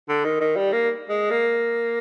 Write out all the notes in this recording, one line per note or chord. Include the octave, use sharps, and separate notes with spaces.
D3
D#3
D#3
G3
A#3
G#3
A#3